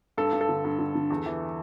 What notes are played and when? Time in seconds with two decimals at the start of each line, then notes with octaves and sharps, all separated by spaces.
0.17 G2 A4
0.33 G2
0.41 A4
0.49 D3
0.65 G2
0.79 D3
0.95 D3
1.10 E2
1.26 E3